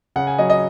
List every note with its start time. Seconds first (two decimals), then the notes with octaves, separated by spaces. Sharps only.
0.16 C#3 F#5
0.27 G#5
0.38 F#3 D#5
0.50 D#5